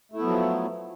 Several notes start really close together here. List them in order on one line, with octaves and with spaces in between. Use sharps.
A3 E4 B3 F#3 F3